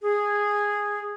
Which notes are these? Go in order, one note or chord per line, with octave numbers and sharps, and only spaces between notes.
G#4